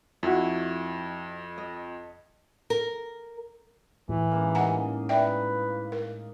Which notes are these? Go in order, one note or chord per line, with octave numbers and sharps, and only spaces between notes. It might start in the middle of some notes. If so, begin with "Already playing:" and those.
F2 E4 F#4
D#5
A#4
A2 E3
G#2 C#3 A#3
C#3 G#4 D#5 F#5 A#5
B4 D5 E5 G5
A#4